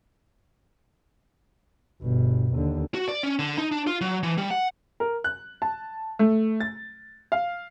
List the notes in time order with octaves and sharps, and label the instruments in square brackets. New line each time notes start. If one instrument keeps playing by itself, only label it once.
[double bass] G1 B2
D#2 D3
[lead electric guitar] F#4
D5
C#4
D3
D#4
D4
F4
F#3
E3
G3
F#5
[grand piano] A#4
F#6
A5
A3
A6
F5